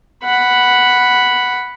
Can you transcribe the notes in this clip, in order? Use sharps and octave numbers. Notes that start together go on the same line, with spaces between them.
F#5 B5